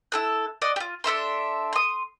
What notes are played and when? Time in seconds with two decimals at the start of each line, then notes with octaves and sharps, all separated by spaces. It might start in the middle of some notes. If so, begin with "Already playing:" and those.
0.12 E4 A4 F#6
0.62 D5 D#5 F#5
0.76 F4 G4
1.04 D4 A4 E5 C6
1.73 C6 D#6